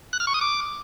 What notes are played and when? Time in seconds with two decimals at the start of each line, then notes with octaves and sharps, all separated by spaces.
0.13 F#6
0.20 F6
0.27 C#6
0.34 D#6
0.41 D6